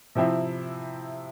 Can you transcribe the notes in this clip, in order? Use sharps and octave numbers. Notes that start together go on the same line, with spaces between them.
C3 F3 C4 E4